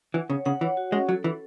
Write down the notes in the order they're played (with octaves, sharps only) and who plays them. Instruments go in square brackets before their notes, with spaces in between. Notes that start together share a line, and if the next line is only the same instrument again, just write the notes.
[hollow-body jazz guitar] E3 [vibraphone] F#5
[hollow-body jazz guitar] C#3 [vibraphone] C#5
[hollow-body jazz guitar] C#3 [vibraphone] F#5
[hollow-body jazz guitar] E3 [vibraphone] C#5
[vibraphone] F#4
[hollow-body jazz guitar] G#3 [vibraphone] C#4
[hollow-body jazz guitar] F#3 [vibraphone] A4
[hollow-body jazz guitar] E3 [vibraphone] A4